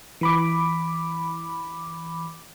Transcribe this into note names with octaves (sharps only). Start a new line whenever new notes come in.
E3 B5 D6